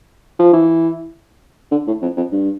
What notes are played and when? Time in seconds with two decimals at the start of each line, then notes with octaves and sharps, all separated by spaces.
0.39 F3
0.53 E3
1.72 D3
1.87 A2
2.02 F2
2.17 F2
2.32 G2